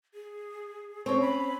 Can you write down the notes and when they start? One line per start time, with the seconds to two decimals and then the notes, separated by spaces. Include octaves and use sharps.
0.14 G#4
1.06 C4 C#4 C#6
1.21 B5